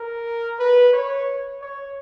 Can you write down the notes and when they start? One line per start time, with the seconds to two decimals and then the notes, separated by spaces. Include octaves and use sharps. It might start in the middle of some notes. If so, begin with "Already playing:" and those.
Already playing: A#4
0.59 B4
0.93 C#5
1.61 C#5